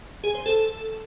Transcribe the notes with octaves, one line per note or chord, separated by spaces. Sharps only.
G#4
C5
A4